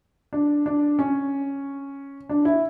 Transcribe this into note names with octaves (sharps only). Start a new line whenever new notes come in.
D4
D4
C#4
D4
E4